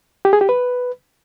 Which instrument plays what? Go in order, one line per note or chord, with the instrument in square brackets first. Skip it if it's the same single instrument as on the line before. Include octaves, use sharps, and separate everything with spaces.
[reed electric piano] G4
G#4
G4
B4